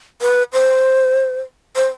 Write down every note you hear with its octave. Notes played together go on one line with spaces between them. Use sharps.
B4
C5
C5